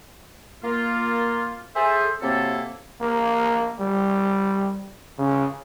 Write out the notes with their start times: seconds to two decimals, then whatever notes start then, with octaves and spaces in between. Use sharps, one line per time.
0.63 A#3 F4
1.76 G#4 A4 C5 E5
2.22 C3 F#3 A#3 C4 E4 A4
3.01 A#3
3.80 G3
5.18 C#3